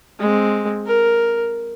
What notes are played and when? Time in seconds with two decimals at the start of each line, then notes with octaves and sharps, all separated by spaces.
0.20 G#3 C4
0.86 A#4